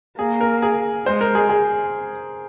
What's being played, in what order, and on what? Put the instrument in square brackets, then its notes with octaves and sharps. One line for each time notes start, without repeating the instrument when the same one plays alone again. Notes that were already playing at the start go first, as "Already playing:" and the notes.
[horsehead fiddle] A#3 [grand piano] G#4
[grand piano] A#4
G#4
[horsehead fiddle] G#3 [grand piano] C5
[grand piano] A#4
G#4
G#4